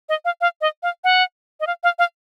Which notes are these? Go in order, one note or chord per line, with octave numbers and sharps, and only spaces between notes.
D#5
F5
F5
D#5
F5
F#5
D#5
F5
F5
F5